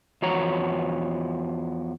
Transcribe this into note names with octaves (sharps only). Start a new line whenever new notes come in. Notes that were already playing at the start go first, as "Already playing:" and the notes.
E2 F3 F#4 C#5 A#5